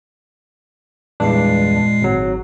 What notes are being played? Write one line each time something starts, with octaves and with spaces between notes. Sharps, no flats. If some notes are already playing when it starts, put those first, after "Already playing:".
E2 G2 A#2 G#3 D4 C7
G#1 F#3